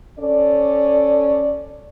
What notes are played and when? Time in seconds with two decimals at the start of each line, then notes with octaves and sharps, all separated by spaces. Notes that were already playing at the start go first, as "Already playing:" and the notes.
0.19 C#4 A4 D5